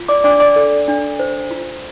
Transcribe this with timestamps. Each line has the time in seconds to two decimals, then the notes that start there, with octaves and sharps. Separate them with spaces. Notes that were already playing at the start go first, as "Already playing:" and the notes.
Already playing: F4
0.08 D5 D6
0.24 D4 D5 D6
0.40 D5 D6
0.56 A4
0.88 D4
1.19 C5
1.51 F4